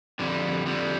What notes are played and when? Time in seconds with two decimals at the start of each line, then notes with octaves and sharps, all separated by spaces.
0.19 F2 D3 G3
0.65 F2 D3 G3